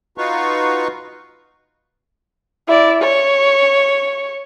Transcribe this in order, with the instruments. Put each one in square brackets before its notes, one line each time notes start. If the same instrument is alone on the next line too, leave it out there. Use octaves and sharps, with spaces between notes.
[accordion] D#4 F4 F#4 B4 F5 C#6
[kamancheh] E4 D5
C#5